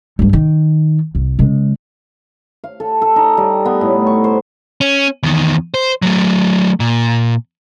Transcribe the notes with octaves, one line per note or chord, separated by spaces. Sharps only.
G2 G3
D#3
C2
C#3 G#3
F5
A4
A4
D#4
G3
B3
A2
C#6
C5
C#4
E2 D#3
C5
F#3 A3
A#2